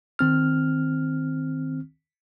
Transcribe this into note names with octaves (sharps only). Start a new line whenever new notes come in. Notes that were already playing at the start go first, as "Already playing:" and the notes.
D#3 C4 F6